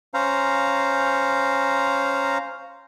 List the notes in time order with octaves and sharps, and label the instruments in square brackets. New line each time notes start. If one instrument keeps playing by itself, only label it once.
[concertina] C#4 C5 F5 A#5